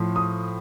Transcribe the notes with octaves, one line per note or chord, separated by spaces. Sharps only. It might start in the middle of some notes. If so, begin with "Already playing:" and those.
Already playing: A2 F3
D#6